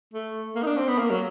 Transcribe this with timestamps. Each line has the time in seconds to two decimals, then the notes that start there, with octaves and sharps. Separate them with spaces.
0.14 A3
0.56 A#3
0.63 D#4
0.66 D4
0.77 C4
0.88 B3
0.99 A#3
1.11 F#3